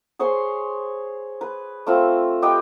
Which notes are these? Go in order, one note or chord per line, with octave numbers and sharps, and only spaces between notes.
G#4 C5 C#5 C6
B4
A3 C4 F4 E6
G4 B4 D#5 G5